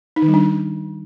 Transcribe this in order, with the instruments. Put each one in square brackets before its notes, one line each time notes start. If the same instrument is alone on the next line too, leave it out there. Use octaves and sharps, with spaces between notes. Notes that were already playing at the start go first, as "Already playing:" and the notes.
[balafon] D#4
D#3
G3
D4